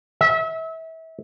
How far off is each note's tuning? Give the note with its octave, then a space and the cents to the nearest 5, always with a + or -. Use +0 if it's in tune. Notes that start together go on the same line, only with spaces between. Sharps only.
E5 -30